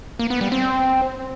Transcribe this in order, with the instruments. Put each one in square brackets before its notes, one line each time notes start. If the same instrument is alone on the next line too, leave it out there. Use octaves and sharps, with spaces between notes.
[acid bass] A#3
B3
G3
C4